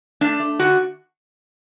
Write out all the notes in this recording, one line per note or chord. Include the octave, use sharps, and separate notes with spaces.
A3 D4
A3
D3 F#4